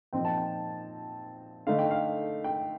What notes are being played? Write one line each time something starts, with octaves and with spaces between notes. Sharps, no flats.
A#2 F3 C4 D#4 G5
A5
G5
D3 A3 D#4 F5
G5
F5
G5